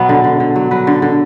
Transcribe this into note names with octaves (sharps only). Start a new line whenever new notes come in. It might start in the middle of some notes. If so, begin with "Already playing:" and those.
Already playing: B2 F#3 B3
D3
D3
D3
F#3
F#3 B4
D3
D3